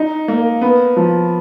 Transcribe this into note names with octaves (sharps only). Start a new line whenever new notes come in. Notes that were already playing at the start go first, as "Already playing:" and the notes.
Already playing: D#4
A#3
B3
F3